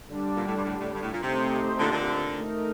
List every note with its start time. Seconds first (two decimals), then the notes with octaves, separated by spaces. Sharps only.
0.08 D3 G3 D4
0.36 A#2
0.46 A2
0.56 G2
0.64 A2
0.79 A2
0.93 G2
1.03 A2
1.12 A#2
1.22 C3 A3 C4 D#4 G4 C5
1.78 A#2 D3
1.92 A#2 D3
2.35 A3 D#4 A#4